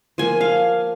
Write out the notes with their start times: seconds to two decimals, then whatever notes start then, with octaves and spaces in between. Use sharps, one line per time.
0.18 F3 A#3 G#5
0.41 F5